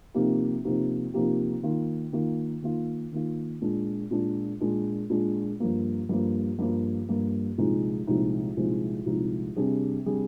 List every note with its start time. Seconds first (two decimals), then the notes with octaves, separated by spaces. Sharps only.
0.14 C3 F3 A#3 D#4 G4
0.64 C3 F3 A#3 D#4 G4
1.14 C3 F3 A#3 D#4 G4
1.63 D#3 A#3 F4
2.12 D#3 A#3 F4
2.62 D#3 A#3 F4
3.12 D#3 A#3 F4
3.61 A#2 G#3 D4
4.11 A#2 G#3 D4
4.61 A#2 G#3 D4
5.10 A#2 G#3 D4
5.60 G2 F3 A#3
6.09 G2 F3 A#3
6.59 G2 F3 A#3
7.09 G2 F3 A#3
7.58 C2 A#2 F3 G#3 D#4
8.07 C2 A#2 F3 G#3 D#4
8.57 C2 A#2 F3 G#3 D#4
9.06 C2 A#2 F3 G#3 D#4
9.56 C3 G3 D4 G#4
10.06 C3 G3 D4 G#4